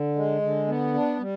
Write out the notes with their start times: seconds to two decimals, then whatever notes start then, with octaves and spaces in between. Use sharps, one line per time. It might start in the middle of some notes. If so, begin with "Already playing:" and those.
Already playing: D3
0.16 G#3
0.42 D3
0.67 B3
0.94 D4
1.19 G3